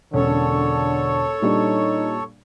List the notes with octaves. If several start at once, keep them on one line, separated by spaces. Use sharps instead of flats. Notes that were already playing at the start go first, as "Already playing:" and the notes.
E1 D3 C#4 A4 C#5
A#2 G3 D4 D#4